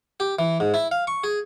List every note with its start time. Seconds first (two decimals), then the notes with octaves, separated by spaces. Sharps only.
0.20 G4
0.39 E3
0.60 G#2
0.74 E4
0.91 F5
1.07 C#6
1.24 G#4